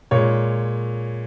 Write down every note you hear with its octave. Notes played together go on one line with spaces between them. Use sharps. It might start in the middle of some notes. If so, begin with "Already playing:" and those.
A#2 G#3 C#5